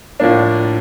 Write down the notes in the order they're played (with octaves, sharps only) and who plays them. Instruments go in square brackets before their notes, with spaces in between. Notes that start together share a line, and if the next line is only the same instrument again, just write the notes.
[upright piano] A2 F3 A#3 D4